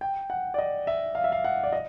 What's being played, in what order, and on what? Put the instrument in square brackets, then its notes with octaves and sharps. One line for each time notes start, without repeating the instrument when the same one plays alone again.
[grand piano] G5
F#5
D5
D#5
E5
F5
E5
F5
F#5
D5
D#5